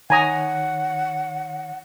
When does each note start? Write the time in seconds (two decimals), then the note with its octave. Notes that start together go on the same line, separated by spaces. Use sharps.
0.10 D#3 C#5 F#5 G#5 A#5 D#6